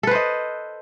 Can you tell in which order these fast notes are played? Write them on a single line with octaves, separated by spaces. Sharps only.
A4 B4 C5 D#5